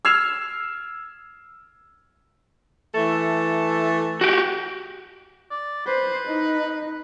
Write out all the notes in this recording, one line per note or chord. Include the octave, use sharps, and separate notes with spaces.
E6 F6 G#6 C7 F7
E3 A3 A4
F#4 G4
D5
B4 C5
D#4